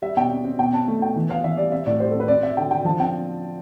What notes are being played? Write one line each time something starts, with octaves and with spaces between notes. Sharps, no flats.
G3 E5
B2 G5
C4
C4
B2 G5
C4 A5
A3
B2 G5
E3
B3 F5
E3 E5
G3 D5
C4 E5
A2 D5
G3 C5
A4
C4
B4
C4 D5
C4 E5
D3 G5
D3 G5
F3 A5
C4 G5